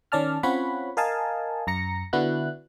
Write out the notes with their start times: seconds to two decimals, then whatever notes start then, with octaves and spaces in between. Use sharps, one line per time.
0.12 D#3 C#4 D5 A5 F6
0.43 C4 C#4 F4 C#5 F#5 B5
0.97 A#4 D#5 F5 G#5 A5
1.67 F#2 A#5 A#6 C#7
2.13 D3 B3 D4 E4 F#4 F#6